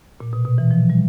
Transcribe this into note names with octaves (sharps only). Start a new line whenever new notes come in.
A#2
B2
B2
E3
F3
G3